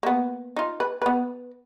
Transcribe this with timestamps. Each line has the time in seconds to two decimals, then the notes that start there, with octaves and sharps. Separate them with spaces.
0.03 A#3 B3
0.56 D#4 F4
0.80 B4
1.02 B3 B4